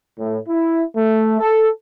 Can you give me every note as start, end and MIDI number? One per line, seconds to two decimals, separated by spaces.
0.18 0.37 45
0.49 0.82 64
0.96 1.38 57
1.40 1.67 69